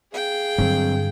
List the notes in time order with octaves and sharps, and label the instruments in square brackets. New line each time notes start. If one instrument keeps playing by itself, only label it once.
[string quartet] G#4 F5 G5
[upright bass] G2 D3 [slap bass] F#3 C4